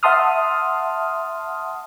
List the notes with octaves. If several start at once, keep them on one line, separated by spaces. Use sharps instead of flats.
E5 F#5 A5 C6 D#6 F6